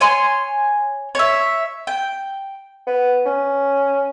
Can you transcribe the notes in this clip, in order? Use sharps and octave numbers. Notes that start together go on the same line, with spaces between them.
C#5 G#5 C6
C#5 E5
G5
B3
C#4